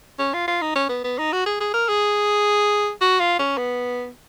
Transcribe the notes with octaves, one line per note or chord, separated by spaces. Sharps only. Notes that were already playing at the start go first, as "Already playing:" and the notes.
C#4
F4
F4
D#4
C#4
B3
B3
D#4
F#4
G#4
G#4
A#4
G#4
F#4
F4
C#4
B3